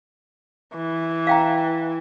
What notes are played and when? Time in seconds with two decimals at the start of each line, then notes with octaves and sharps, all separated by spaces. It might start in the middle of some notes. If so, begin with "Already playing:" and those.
0.74 E3
1.27 F5 G5 A#5